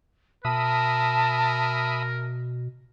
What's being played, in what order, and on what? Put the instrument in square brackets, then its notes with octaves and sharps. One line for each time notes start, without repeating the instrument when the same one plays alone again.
[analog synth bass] B2 [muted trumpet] A#4 [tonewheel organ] E5 B5 D#6 [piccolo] A5